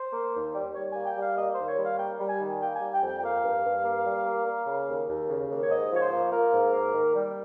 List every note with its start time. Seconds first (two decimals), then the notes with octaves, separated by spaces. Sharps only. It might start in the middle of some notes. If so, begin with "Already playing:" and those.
Already playing: C5
0.12 A#3
0.34 D#2
0.54 G3
0.74 G3 C#5
0.91 A#3 G#5
1.06 G5
1.17 G3
1.22 F5
1.37 A#3 D#5
1.52 C5
1.58 D#2
1.68 C#5
1.79 G3 F5
1.98 A#3 G5
2.20 G3
2.29 G#5
2.41 D#3
2.61 A#3 G5
2.76 G3 G#5
2.92 G5
3.02 F2
3.07 G5
3.18 G5
3.23 A#3 F5
3.43 G2
3.64 G2
3.85 A#3
4.05 G3
4.26 A#3
4.46 A#3
4.66 C#3
4.88 D#2
5.08 D#2
5.29 C#3
5.50 D#2
5.62 C#5
5.69 G#2 D#5
5.91 F3 C#5
6.01 C5
6.12 A#3
6.31 A#3 A#4
6.53 G#2
6.73 A#3
6.93 D#3
7.14 G3